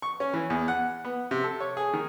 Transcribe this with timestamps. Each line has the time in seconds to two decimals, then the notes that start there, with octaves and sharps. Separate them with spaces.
0.02 C#6
0.20 C#4
0.34 E3
0.50 E2
0.68 F#5
1.05 B3
1.31 C3
1.44 A4
1.60 C#5
1.77 G#4
1.93 D#3